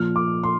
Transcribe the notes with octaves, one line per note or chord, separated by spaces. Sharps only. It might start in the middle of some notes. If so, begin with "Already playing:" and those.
Already playing: A#2 F3 F6
D6
C6